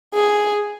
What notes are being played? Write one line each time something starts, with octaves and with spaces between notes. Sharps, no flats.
G#4